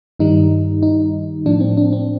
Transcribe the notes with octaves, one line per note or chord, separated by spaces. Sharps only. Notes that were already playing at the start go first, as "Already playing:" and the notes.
G2 D#3 G3 D#4
D#4
A2 F3 D4
C4
D4
C4